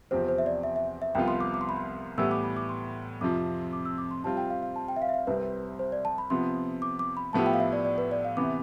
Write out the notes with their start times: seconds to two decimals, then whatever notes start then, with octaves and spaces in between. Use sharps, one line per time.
0.11 E2 C3 F3 C4 G4 C5
0.28 C5
0.38 E5
0.46 D5
0.63 E5
0.76 E5
1.02 E5
1.15 C2 C3 F3 B3 F4 G5
1.28 C6
1.40 D6
1.54 D6
1.61 C6
1.69 B5
1.76 C6
2.18 A2 E3 G3 B3 E6
2.31 D6
2.43 B5
2.56 D6
2.69 C6
3.21 F2 C3 F3 D6
3.73 D6
3.85 E6
3.98 D6
4.11 C6
4.24 C3 G3 C4 F4 A5
4.37 G5
4.50 F5
4.63 F5
4.76 A5
4.88 G5
4.96 E5
5.02 F5
5.09 E5
5.14 F5
5.27 C2 C3 G3 C4 B4
5.79 C5
5.92 D5
6.05 A5
6.18 B5
6.30 C3 F3 B3 C6
6.82 D6
6.99 D6
7.17 B5
7.33 A2 F3 B3 E4 G4 A5
7.46 G5
7.54 F5
7.60 E5
7.73 D5
7.85 D5
7.98 B4
8.11 D5
8.25 F5
8.37 C3 E3 B3 D6